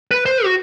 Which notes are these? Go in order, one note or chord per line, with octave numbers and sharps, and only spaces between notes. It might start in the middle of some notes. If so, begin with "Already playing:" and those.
B4
C5
F#4